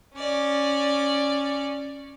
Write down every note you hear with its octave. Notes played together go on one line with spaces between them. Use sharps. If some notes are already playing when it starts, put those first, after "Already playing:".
C#4 D5